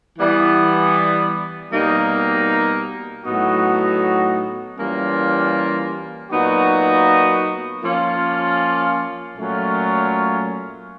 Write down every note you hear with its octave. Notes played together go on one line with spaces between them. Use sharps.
E3 G3 B3
B2 G3 A#3 D#4
A2 F#3 B3 D#4 F#4
E3 G3 A#3 C#4 F4
A#2 F#3 B3 D#4 F#4
F3 A#3 C#4 F4
A#2 F#3 A3 C#4 F4